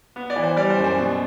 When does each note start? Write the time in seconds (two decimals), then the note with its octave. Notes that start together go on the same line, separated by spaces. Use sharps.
0.16 B3
0.30 D5
0.36 E3
0.43 C5
0.57 G3 D5
0.70 C5
0.77 F#2
0.84 C5
0.98 B2